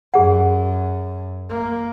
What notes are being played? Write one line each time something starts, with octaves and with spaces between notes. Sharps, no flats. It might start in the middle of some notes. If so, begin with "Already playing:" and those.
F#2 G#4 F#5
A#3